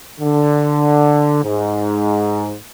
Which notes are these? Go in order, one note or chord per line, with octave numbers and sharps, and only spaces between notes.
D3
G#2